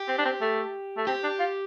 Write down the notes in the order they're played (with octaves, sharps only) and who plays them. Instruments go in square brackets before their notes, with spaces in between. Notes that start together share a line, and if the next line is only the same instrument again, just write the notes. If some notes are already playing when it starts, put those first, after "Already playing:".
Already playing: [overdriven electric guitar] G4
[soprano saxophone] C4
D4
C4
A3
A3
[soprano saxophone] C4 [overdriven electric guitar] G4
[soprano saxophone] D4
F4